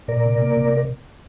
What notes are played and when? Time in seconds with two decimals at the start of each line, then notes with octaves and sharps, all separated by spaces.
0.08 A#2 A#4 D5
0.26 C3
0.42 A#3
0.57 C3